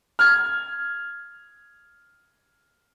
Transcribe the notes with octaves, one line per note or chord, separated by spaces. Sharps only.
F6 G#6